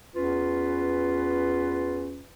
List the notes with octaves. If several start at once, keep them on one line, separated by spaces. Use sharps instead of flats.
E2 C#4 F4 B4